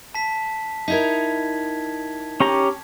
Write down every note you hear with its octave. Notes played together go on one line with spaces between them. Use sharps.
A5 B6
D#4 E4 A#4 G#6 B6
C#4 G4 A#5